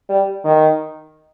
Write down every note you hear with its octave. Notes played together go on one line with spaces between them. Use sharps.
G3
D#3